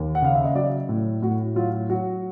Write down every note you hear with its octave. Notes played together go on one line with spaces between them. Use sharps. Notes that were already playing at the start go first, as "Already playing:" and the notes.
Already playing: D#2
F#5
C#3 F5
E5
D#5
F#3 D5
A2
A2 F#4
F#3 F4
F#3 F#4